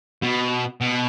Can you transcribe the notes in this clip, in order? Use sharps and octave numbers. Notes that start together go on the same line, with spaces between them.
B2
B2